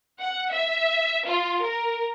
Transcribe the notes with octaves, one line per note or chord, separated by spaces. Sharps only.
F#5
E5
F4
A#4